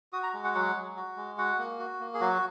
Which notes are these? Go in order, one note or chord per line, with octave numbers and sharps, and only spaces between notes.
F#4 D#6
A#5
G#3
F#5
F#3 F#5
F#3
F#4
G#3
F#4 F#5
A#3
F#4
A#3
G#4
F#3 F#4